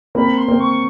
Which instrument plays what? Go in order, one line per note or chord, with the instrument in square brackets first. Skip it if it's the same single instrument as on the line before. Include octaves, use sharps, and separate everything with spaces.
[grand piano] A#3 C4 [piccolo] B5
[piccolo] C6
[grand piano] A#3 C4
[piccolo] C#6